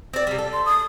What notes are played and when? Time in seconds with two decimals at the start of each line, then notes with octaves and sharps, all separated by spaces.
0.14 C4 D5
0.27 C3 G3
0.38 A4
0.53 C6
0.66 D#6